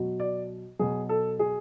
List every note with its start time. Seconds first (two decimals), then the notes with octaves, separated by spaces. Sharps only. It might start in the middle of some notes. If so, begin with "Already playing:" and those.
Already playing: B2 F#3
0.20 D5
0.79 B2 F#3 G#4
1.09 A4
1.39 G#4